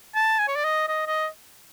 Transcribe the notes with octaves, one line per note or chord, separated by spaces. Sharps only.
A5
G#5
C#5
D5
D#5
D#5
D#5